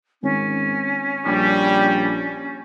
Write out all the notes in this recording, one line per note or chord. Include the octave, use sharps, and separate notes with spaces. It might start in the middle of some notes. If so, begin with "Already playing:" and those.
G#1 C#4
A#1 G3